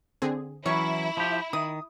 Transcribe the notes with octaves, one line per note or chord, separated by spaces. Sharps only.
D3 C4 G#4
E3 F#3 C#4 E4 C#5 C#6
F3 G4
D#3 D#6